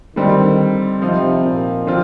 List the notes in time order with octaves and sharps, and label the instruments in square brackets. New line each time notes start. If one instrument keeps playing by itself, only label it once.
[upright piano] D3 G3 C4 D#4 [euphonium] D#3
[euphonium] C3 [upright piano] F3 C4 D#4
[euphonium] A#2
[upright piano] D3 F3 C4 F4